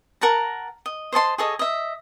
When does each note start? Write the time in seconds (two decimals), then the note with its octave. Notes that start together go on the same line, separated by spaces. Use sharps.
0.21 A#4 F#5 A5 A#5
0.86 D#5
1.12 C5 D#5 A5 C6
1.38 G#4 A4 C#5 D#5
1.59 D#5 E5